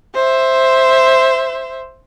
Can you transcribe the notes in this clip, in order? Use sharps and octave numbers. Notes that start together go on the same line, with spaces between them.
C5 E5